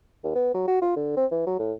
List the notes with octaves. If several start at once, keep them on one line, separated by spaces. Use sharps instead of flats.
D#2
B3
F#3
F#4
F4
D3
C4
E3
F#3
A2